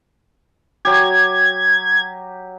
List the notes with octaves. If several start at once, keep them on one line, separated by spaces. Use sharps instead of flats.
F#3 G4 G#6